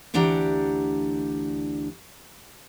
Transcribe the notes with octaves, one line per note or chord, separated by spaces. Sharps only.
D2 E3 D4 G4 F#5 A#5